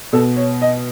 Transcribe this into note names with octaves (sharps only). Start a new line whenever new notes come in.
B2 A4
C#5
D#5